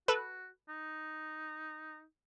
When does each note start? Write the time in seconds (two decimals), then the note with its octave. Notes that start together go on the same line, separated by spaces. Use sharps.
0.08 F#4 A4 B4
0.69 D#4